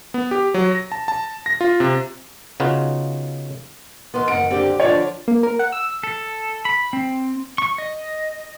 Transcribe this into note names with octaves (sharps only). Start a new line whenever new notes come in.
B3
G4
F#3
A#6
A5
A5
A#6
F4
C3
C#3 B3 D#4 F4 F#4
D#3 B3 C6
F#1 A#4 F#5 D7
D3 C4 G4 G5
D3 F3 C#5 D5 C#6
A#3
A#4
F#5
E6
A4
B5
C4
C#6
D#5